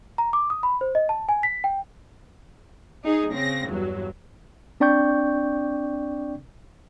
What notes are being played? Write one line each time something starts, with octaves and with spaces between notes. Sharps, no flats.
A#5
D6
D#6
B5
C5
D#5
A5
G#5
B6
G5
D#4 G#4
C#3 C4 A#6
E2 G2 F#3
C4 D4 D5 G5 C#6 G6